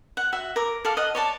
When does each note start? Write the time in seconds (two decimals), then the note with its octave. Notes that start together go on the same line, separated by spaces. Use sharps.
0.17 F#5
0.33 F#4 E5
0.56 A#4 D6
0.85 A4 D5 F5
0.97 D#5 F#5
1.15 C#5 D5 A5